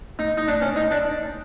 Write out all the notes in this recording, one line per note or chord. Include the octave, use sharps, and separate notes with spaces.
D#4
D#4
D4
C#4
D#4
D4